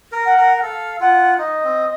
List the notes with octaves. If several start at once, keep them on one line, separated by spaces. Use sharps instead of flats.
A#4
F#5
A#4
F#5
A4 F5
F4 F#5
D#4 D#5
C4